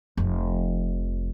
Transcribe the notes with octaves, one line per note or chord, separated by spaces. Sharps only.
F1 F3